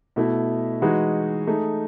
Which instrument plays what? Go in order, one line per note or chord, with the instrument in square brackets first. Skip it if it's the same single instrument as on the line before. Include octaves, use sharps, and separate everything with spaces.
[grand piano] B2 A3 E4
E3 G#3 D#4 F#4 B4
A3 D#4 G#4